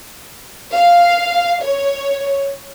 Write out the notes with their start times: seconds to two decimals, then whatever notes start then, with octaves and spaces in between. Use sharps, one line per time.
0.73 F5
1.63 C#5